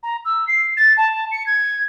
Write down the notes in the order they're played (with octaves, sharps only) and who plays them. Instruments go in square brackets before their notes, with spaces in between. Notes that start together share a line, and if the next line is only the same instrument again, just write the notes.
[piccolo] A#5
E6
C7
A6
A5
C#7
G#6